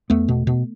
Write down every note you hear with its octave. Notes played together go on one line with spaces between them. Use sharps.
E2 A3 B3
B2
B2